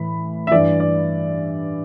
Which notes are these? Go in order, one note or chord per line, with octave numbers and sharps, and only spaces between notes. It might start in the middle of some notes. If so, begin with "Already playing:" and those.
Already playing: A2 E3 B5
E5
G2 E3 D5
D5